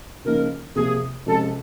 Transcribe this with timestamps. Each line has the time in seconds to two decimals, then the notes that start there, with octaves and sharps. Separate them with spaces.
0.25 C#3 F3 A#3 D#4 A#4
0.75 C3 F3 A#3 G#4
1.26 C3 F3 G#3 C#4 A4